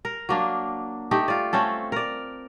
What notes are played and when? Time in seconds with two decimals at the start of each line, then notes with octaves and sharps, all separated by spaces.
0.05 A#4
0.29 F#3 A#3 D4
1.11 A3 D#4 G4
1.28 F4 D5
1.53 A3 C4 C#4 A4
1.92 A#4 D5